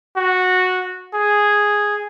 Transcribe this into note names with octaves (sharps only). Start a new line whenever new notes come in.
F#4
G#4